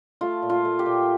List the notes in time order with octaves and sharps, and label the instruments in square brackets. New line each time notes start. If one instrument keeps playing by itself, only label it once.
[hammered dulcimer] A3 F4
A#2
F4
A3
G4
A#2